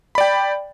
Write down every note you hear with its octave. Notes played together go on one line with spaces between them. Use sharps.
D5 G5 B5